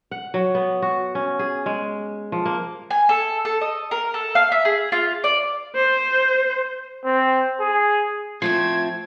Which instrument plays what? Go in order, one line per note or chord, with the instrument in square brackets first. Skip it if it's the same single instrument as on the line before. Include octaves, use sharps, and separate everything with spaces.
[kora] F#5
F#3
B3
F#4
C#4
G#4
G#3
F3
A#3
[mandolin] G#5
A4
A4
D#5
A#4
A4
F5
E5
G#4
F4
D5
[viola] C5
[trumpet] C4
G#4
[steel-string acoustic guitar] F3 A3 C4 [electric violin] G#6